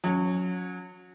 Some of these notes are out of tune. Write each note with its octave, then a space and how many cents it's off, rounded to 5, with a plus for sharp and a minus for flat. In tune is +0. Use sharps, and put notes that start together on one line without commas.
F#3 -30 C#4 +0